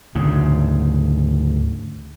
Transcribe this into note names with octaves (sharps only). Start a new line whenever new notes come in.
D2 G#2 C#3